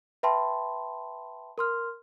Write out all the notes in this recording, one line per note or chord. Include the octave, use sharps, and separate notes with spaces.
B4 E5 G5 A5 B5 C6
A#4 C6 F6